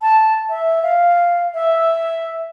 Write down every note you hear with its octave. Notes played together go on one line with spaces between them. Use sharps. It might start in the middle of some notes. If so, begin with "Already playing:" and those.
A5
E5
F5
E5